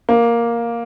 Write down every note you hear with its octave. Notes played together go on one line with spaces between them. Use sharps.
A#3